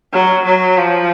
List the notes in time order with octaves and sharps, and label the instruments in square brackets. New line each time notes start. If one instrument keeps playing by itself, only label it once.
[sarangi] F#3
F#3
F3